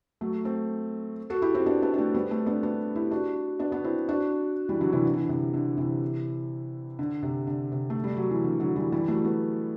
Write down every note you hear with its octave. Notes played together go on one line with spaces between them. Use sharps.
F#3 A3
A3 C4
F#4 A4
E4 G4
C4 E4
B3 D4
B3 D4
D4
A3 C4
G3 B3
A3 C4
B3 D4
B3 D4
E4 G4
D4 F#4
B3 D4
B3 D4
C4 E4
D4 F#4
E3 G3
D3 F#3
C3 E3
D3
E3
D3
C3
D3
C3 E3
D3
C3
D3
C3
A3
G3
F#3
E3
D3
D3 F#3
E3 G3
E3 G3
F#3 A3
G3 B3